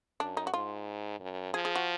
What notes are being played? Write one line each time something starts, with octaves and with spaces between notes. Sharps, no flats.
F#2 D4
D#4
F#4
G#2 F4
F#2
F3 G#4
G#4
F#4